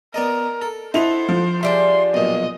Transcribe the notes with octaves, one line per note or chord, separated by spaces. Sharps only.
B3 A#4 D5 D#5
A4
E4 A4 C5 D#5 F#5 F7
F3
G3 D4 G#4 E5 C6
B1 A#2 D#5